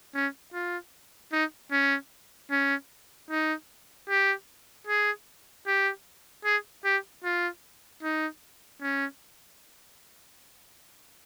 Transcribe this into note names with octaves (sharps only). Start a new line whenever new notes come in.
C#4
F4
D#4
C#4
C#4
D#4
G4
G#4
G4
G#4
G4
F4
D#4
C#4